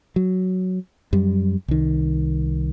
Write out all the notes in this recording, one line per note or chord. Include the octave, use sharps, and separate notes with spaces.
F#3
F#2 G3
C2 D#3